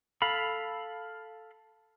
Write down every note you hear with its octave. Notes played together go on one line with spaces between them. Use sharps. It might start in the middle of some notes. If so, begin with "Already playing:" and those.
A4 F5 B5